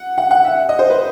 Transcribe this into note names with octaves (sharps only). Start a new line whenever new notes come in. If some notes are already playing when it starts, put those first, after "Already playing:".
Already playing: F#5
F#5
F#5
E5
D#5
C5
B4